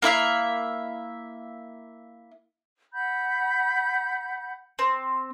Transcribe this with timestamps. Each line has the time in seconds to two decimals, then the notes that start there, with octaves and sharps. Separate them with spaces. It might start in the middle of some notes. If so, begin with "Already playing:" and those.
0.02 A#3 E4 E5 F5
2.93 F#5 B5 G6
4.79 C4